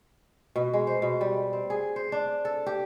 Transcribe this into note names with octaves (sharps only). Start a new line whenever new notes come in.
B2
G#3
C5
B2
G3
C4
G#4
C5
D4
A4
G4